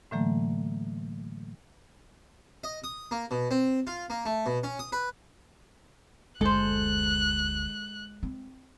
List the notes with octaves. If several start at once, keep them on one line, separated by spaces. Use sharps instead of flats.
A2 D3 E3 F#3 A3 A#3
D#5
D#6
A#3
B2
C4
F4
A#3
A3
B2
C#4
D#6
B4
F#1 D2 G#3 A4 C5 F#6
C4